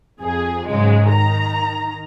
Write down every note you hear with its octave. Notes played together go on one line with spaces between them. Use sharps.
F2 G#4
G#2 C#3 F#3 G#3
D#3 A#5